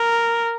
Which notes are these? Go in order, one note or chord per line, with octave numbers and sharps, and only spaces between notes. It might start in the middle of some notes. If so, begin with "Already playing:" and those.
Already playing: A#4